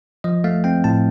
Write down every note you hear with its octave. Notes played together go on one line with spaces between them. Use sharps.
F3 D#5
A3 F5
C4 G5
A2 A5